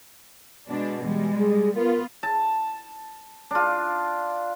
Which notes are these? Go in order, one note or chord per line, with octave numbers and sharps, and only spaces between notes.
B2 G#3 D4
E3 G3 G#3
G#4
B3 F4 A#4
A5
D4 F4